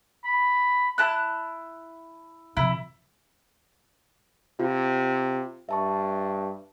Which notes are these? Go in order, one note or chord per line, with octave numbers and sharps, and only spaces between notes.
B5
E4 A5 F#6
F2 C3 E4
C3 F4
G2 E5 A5 C#6